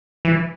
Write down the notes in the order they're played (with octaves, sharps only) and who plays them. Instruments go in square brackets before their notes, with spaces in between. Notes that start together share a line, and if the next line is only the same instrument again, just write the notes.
[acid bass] E3